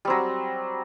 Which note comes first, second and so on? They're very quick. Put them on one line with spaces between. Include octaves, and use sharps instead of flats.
G3 C4 F#3